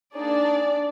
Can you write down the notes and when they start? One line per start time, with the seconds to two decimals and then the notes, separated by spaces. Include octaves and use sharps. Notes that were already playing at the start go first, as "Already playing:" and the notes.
0.16 A#3 D4 D#4 G#4 D5